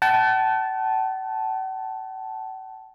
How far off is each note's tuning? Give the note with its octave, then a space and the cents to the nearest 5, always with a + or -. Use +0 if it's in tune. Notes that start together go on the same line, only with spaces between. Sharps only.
F#5 +45 A5 -10